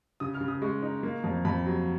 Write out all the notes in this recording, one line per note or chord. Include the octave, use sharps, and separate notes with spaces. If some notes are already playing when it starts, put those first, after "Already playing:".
C#3 D#6
F6
C#3
D#6
G#3 C#6
D#4
A#3
F2
F2 B5
F#3